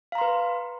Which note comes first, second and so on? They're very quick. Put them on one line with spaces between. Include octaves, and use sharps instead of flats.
F5 A#5 C6 B4